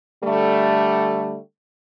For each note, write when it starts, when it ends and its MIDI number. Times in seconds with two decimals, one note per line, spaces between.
0.23 1.37 50
0.23 1.37 55
0.23 1.37 57